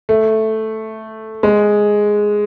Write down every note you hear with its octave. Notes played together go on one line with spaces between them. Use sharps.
A3
G#3